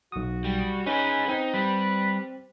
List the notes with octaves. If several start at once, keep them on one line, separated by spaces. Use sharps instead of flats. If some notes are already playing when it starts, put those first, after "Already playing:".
B1 F#4 D#6
G3
C#4 D#4 G#4 B4
C4 D#4
G3 B4